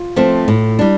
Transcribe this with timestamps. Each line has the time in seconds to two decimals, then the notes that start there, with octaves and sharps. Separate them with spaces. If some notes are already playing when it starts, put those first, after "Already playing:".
Already playing: F4
0.16 F3 A3 C4
0.48 A2
0.79 G3 D4